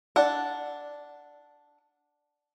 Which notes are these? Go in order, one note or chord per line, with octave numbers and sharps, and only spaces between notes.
D4 F#5